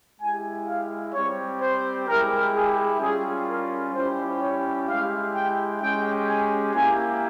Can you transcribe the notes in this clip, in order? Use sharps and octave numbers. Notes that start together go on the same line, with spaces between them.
G#3 E4 G4 G#5
F5
G3 C4 G4 C#5
C5
G#3 E4 G4 A#4
G#4
G3 C#4 F4 G#4
A#4
G3 C#4 E4 G4 C5
C#5
G#3 E4 G4 F5
G5
G#3 C#4 G4 G5
G#5
A#3 E4 G4 G#5